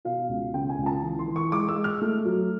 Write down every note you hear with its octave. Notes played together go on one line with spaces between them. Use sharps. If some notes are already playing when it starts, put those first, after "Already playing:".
B2 F5
C#2
C#3 G5
G#5
C#2
A5
E3
C6
E3
C#6
G#3 D6
E6
G#3
F6
A3
F#3